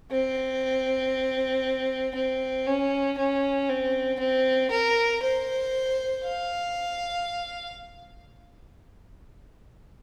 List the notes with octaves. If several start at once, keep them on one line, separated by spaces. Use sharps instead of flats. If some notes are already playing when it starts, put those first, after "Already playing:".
C4
C4
C#4
C#4
C4
C4
A#4
C5
F5